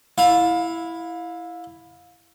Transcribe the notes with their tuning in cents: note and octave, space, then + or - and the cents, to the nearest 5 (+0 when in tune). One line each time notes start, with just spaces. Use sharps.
E4 +0 F5 +30